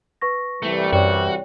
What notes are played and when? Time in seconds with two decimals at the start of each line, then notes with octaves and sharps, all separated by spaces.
0.21 B4 C#6 A#6
0.62 C2 E3 G3 A3
0.93 F#2 F#4 C#5 D5 G5